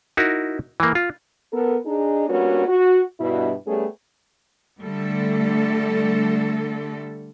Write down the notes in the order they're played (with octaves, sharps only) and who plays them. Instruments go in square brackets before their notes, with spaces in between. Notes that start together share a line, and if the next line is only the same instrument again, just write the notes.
[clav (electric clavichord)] D#4 E4 F#4 A#4
E3 A#3
F4
[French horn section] B3 A4 A#4
D4 D#4 G#4
G3 A#3 B3 C#4 D4 F#4
F#4
G2 B2 E4
G3 A3 B3 C#4 G4 G#4
[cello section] D3 G3 A3 A4